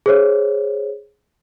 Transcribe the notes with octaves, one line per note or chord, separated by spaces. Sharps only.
G#4 C5 C#5